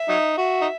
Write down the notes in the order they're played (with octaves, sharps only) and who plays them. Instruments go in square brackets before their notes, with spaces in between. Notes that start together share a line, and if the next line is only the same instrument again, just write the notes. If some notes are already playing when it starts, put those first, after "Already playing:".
Already playing: [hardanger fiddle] E5
[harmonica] F#3 D#4
[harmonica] F#4 [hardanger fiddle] E5
[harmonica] D#4